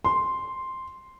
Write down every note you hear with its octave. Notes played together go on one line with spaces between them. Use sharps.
C6